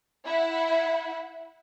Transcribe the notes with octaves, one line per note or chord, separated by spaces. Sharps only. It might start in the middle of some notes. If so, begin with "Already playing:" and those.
E4 E5 F#5